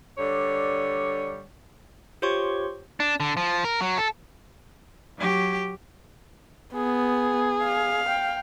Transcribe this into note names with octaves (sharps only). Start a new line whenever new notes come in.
D3 G3 C#5
F4 G4 C5 C#5 C6 C#6
D4
D3
F3
A#4
F#3
A4
F#3 G4
B3 G#4
F5
G5